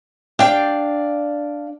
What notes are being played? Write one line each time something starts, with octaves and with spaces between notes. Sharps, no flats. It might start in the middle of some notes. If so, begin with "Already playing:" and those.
D4 G4 D5 F5 G5